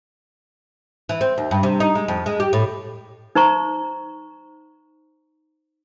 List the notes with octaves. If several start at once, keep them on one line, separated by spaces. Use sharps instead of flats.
E3
C4
D#2
G2
C3
D#4
G#3
F2
G#3
G4
A2
D#4 C5 A#5 C#6